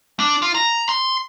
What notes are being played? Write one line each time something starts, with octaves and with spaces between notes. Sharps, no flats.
D4
F4
A#5
C6